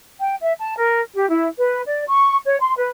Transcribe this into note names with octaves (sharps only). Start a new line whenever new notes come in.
G5
E5
A5
A#4
G4
E4
B4
D5
C#6
C#5
C6
B4